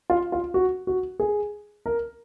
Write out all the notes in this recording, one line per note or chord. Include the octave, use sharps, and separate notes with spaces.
F4
F4
F#4
F#4
G#4
A#4